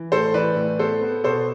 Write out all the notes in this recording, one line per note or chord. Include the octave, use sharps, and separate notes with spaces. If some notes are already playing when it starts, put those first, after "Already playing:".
Already playing: E3
A2 A4 C5
E3 B4 D5
A2
B3 A4 C5
B3
B2 A4 C5